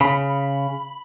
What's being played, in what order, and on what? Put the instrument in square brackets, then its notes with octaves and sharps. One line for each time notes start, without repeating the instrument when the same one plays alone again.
[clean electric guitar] C#3 [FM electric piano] B5